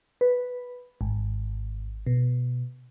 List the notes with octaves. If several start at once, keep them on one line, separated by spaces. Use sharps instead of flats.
B4
G#1
B2